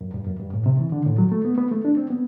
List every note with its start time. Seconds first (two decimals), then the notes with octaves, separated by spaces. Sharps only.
0.01 F#2
0.14 G2
0.26 F#2
0.40 G2
0.54 A2
0.66 C3
0.79 E3
0.92 D3
1.06 A2
1.18 F#3
1.32 A3
1.45 B3
1.58 B3
1.71 A3
1.85 D4
1.97 C4
2.10 B3